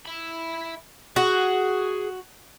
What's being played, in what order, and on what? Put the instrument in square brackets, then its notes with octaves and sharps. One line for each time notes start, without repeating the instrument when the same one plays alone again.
[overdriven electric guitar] E5 B5
[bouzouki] F#4 [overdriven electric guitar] G#4